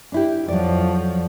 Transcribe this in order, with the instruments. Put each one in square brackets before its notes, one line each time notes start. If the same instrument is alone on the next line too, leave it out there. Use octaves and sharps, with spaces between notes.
[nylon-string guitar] D4 E4 G4
[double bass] F2 F3 [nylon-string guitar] F#3 D5